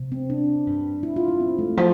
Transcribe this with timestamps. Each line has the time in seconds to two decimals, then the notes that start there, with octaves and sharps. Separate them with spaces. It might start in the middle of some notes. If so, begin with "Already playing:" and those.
Already playing: C3
0.12 C4
0.30 D4
0.67 G2
1.03 E4
1.16 F4
1.28 E4
1.40 C4
1.59 A3
1.77 F3